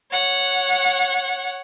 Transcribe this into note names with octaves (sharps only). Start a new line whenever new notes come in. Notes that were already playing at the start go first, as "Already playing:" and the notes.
C#5 F#5